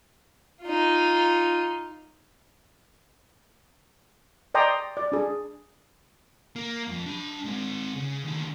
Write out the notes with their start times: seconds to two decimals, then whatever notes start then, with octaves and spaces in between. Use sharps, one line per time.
0.62 D#4 F4
4.54 D5 D#5 G5 A#5 C6 D#6
4.97 D5
5.12 D4 G#4
6.56 A#3
6.89 F2 F3
7.07 D4 B5
7.45 G#3 C4
7.96 C#3
8.25 D#2 D3